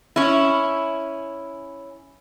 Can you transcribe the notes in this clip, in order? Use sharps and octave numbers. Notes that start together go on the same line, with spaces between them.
C#4 E4